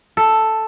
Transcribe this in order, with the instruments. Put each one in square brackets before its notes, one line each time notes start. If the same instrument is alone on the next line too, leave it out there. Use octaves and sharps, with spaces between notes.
[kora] A4